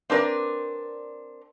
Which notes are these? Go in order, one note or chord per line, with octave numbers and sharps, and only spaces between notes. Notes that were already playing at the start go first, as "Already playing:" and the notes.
C4 D4 A#4 B4 D5